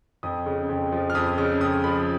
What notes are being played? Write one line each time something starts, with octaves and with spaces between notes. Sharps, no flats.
F2 D#6
C#3
F2
F3
F6
F2 D#6
C#3 F6
F2 D#6
F3 B5